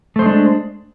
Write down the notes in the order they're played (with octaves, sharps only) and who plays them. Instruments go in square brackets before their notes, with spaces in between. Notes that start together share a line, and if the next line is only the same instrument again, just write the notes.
[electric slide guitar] A3
C5
G#3
D4